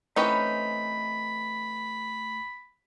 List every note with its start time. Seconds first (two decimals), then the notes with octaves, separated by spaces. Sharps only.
0.16 E3 A3 C4 C#4 D#4 B4 B5